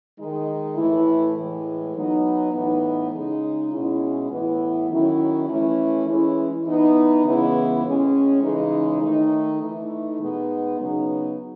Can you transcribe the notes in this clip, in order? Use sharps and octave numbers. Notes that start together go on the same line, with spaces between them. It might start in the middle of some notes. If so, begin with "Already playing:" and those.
D#3 G#3 D#4
A2 E3 A3 E4
A2 E3 G#3
F#3 B3 D#4
A2 E3 B3 D#4
C#3 G#3 D#4
B2 G#3 C#4 E4
A2 E3 B3 E4
D#3 F#3 C#4 E4
E3 A3 C#4 E4
E3 G#3 C#4 E4
E3 B3 D#4
C#3 E3 G#3 B3 E4
A2 G#3 C#4
C#3 E3 G#3 D#4
D#3 A3 D#4
E3 A3 D#4
B2 G#3 B3 D#4
C#3 F#3 B3 D#4